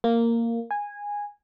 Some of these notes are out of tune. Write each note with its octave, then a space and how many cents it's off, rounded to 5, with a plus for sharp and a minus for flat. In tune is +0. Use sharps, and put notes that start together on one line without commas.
A#3 -10
G#5 -15